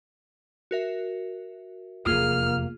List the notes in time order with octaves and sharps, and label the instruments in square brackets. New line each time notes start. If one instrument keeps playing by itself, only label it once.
[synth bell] F#4 A#4 E5
[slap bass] F1 E2 [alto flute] A#3 [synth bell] F4 G#4 [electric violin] F6